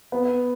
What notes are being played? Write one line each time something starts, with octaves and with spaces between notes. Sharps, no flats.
B3